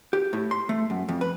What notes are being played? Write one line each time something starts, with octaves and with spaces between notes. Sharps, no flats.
G4
A2
C6
A3
F#2
F2
B4